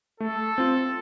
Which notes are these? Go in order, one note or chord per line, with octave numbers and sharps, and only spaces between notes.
A3 A4
C4 F4